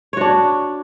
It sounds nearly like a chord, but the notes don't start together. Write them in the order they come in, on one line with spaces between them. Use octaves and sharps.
C#5 F#4 D4